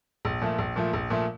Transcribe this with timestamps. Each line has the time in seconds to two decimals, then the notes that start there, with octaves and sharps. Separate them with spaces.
0.25 A#1
0.41 A#2 F3 A3
0.58 A#1
0.76 A#2 F3 A3
0.93 A#1
1.10 A#2 F3 A3